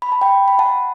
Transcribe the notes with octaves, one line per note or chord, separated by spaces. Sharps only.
B5
A5
G5 B5
B5
F#5 A5